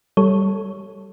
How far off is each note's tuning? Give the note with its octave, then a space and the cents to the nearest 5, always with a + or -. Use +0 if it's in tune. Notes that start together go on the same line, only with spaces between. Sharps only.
G3 -10 A4 +0 C#5 +0